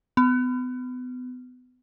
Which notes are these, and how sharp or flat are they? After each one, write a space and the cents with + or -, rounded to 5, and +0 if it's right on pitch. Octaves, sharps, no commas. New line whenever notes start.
B3 +30